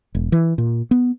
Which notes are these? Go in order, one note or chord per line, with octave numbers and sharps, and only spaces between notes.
E1
E3
A#2
B3